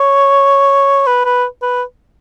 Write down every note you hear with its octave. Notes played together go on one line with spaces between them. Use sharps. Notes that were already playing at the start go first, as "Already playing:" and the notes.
Already playing: C#5
B4
B4
B4